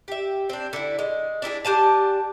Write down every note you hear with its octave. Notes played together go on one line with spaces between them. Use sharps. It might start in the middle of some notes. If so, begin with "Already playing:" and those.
G4 E5
C4 D4
D3 E4
G#3
D4 E4 G4 G#4
D4 G4 G#5 A5